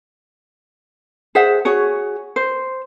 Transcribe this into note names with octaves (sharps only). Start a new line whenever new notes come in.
G#4 C5 E5 F#5
F#4 G#4 C#5
C5